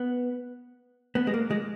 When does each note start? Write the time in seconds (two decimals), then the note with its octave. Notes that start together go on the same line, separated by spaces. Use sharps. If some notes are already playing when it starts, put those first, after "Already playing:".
Already playing: B3
1.15 B3
1.27 G#3
1.34 A#3
1.51 G#3